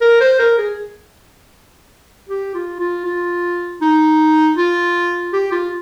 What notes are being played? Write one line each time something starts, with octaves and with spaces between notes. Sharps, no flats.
A#4
C5
A#4
G#4
G4
F4
F4
F4
D#4
F4
G4
F4